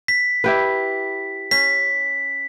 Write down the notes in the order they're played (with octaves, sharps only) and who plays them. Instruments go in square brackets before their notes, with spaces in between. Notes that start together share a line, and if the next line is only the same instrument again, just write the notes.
[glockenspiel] B6
[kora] E4 G4 B4
[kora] C#4 [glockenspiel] B6